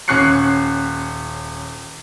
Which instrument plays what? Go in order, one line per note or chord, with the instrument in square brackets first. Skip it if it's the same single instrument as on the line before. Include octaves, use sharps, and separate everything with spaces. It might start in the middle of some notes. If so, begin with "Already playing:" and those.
[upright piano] D#1 C#4 C#6 F#6 C7 C#7